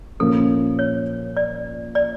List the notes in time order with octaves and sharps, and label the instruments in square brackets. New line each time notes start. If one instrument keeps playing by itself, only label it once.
[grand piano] A#2 F3 A#3 C#4 [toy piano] A4
[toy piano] C#5
D5
D5